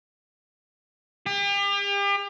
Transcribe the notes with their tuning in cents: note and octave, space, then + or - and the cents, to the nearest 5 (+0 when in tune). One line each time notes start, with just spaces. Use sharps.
G4 +40